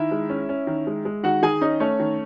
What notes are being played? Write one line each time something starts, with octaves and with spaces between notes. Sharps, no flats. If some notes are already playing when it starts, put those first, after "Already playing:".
Already playing: D#3 E4 E5
G#3
C#4
C#4
D#3
G#3
G#3
D#3 F#4 F#5
D#3 G#4 G#5
C#4 D#4 D#5
A3 C#4 C#5
D#3